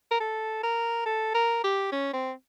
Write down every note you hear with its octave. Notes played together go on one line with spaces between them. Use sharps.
A#4
A4
A#4
A4
A#4
G4
C#4
C4